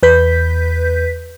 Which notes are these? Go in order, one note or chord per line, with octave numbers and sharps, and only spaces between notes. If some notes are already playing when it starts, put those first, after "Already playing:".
E2 B4 G6 B6